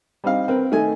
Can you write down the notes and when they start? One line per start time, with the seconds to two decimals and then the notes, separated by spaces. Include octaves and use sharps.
0.24 G3 C4 D#4 F5
0.48 C4 A#4 B4
0.71 D#3 A3 D#4 G#5